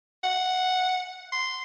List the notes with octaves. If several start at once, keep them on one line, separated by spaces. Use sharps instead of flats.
F#5
C6